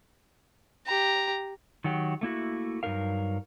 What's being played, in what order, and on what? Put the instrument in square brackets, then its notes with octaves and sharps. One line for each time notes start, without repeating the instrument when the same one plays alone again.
[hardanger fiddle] G4 A#5
[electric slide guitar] D#3 F#3 F#4 G4
A3 A#3 E4 F#4
G2 F#3 D#4 A#4 F5